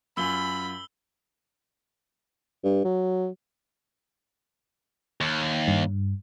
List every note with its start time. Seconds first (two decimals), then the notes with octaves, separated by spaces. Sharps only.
0.17 F#2 F4 G#5 B5 E6 G7
2.64 G2
2.85 F#3
5.21 D#2
5.68 G2